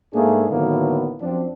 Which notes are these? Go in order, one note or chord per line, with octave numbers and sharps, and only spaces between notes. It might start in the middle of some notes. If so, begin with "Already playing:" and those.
G#2 A3 A#3 D4 G#4
A2 D3 D#3 F#3 A#3 B3
F#2 F3 C4 D4